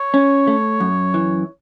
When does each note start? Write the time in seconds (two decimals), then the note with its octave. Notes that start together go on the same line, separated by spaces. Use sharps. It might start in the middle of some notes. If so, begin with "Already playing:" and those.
Already playing: C#5
0.14 C#4
0.47 A3
0.80 F#2
1.14 E3